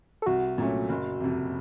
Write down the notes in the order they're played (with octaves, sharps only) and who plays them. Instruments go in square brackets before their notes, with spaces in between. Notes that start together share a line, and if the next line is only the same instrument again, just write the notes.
[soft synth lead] A4
[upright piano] C2 [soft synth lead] F#4
[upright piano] A#2 F#3 A3 C#4
F#1
F2 C3